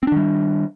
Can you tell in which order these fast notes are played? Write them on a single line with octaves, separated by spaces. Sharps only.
C4 D4 D#3 G3